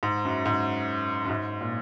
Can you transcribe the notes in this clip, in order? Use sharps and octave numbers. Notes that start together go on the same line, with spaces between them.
G#2
F#2
G#2
F#2
G#2
A#2